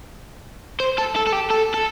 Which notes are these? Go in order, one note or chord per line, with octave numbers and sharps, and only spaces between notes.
C5
A4
A4
A4
G4
A4
A4